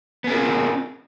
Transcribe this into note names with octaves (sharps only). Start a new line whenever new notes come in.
B3 C4 F4 G#4 A#4